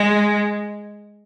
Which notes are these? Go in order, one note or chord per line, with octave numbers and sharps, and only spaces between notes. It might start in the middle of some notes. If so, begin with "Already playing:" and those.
Already playing: G#3